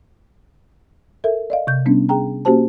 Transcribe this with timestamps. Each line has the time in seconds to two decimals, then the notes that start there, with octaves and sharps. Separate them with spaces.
1.24 A4 A#4 E5
1.50 D5 D#5 F5
1.67 C3 G6
1.86 G3 B3 C#4 D4
2.09 G#4 G5 A#5
2.45 A#3 C#4 F#4 G4 C5 A5